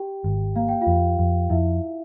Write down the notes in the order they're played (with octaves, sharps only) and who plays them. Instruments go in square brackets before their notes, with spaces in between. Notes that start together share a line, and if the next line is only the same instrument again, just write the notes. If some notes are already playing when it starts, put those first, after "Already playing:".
Already playing: [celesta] G4 G5
[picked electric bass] G#1
[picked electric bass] A#3 [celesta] F5
[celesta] G5
F4 F5
[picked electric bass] F2
F2
[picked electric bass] F2 [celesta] E4 E5